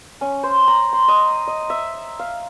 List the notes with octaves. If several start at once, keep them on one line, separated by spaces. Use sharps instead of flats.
C#4
C5
A#5
C6
D#5
D#5
E5
F5